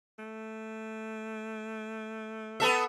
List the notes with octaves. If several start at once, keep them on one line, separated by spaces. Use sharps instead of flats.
A3
B3 A4 E5